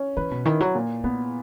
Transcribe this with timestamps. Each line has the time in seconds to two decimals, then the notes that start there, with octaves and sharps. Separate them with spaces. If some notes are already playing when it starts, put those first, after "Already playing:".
Already playing: C#4
0.17 E3 B4
0.31 B2
0.45 D#3 E4
0.60 F#3
0.75 A#2
1.04 A#3 B3